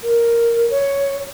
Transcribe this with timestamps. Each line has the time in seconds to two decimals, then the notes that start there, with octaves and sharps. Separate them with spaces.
0.03 A#4
0.70 C#5